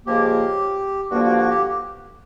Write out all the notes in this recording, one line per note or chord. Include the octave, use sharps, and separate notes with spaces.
C#2 C#3 F3 A#3 G4
G2 D3 F3 A#3 F#4
F#4
F#4
G4